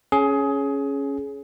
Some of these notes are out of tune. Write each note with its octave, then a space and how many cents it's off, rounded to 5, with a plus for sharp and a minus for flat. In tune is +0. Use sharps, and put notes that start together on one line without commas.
C#4 +0 G#4 +20